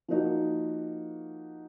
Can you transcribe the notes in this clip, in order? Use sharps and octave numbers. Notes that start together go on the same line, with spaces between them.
F3 A#3 D#4 F#4